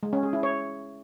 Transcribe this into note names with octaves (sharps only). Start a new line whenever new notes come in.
G#3
C#4
G#4
E4
C#5